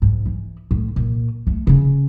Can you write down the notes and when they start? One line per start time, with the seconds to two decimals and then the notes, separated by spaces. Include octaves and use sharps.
0.02 G#2
0.26 E3
0.71 A2
0.96 A#2
1.47 A3
1.67 C#3 C#4